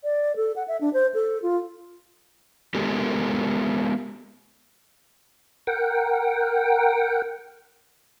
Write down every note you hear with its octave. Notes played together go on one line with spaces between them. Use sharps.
D5
A4
F#5
E5
D4
C5
A4
F4
G#3 B3 G4 A4 A#4
A#4 F#5 G5